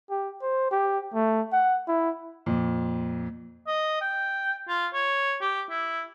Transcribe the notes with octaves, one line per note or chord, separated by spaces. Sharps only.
G4
C5
G4
A3
F#5
E4
F2 A#2
D#5
G5
F4
C#5
G4
E4